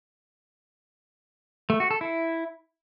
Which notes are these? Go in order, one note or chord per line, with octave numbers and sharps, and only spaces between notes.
A3
F#4
A4
E4